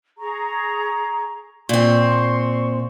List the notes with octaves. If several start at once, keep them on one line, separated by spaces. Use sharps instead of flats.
G#4 A#5 C#6
A#2 C4 C6 C#6